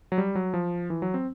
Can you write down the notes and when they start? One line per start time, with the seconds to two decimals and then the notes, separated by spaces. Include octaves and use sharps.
0.12 F#3
0.18 G3
0.35 F#3
0.54 F3
0.90 E3
1.02 F#3
1.14 C4